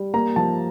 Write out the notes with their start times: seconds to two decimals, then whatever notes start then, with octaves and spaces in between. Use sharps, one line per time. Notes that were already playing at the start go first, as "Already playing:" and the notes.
Already playing: G3
0.14 A#3 A#5
0.36 F3 A5